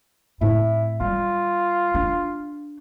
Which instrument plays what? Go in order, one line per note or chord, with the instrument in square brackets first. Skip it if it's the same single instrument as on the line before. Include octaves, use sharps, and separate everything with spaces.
[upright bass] A2 C4 [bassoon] E4
[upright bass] G3 [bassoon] F4
[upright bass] D4